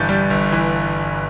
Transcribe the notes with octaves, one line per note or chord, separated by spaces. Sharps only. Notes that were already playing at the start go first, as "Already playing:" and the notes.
Already playing: G1 G2 E3 G6 A6
G3
G1
E3